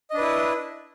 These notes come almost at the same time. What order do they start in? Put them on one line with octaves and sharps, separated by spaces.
D#5 D4 B4 E4